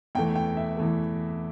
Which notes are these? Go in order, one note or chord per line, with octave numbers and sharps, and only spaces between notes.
E2 E3 A3 G5
G5
E5
E2 E3 A3